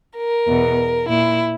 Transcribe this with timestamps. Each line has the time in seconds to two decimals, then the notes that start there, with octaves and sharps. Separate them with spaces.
0.17 A#4
0.48 E2 B2
1.09 A#2 E4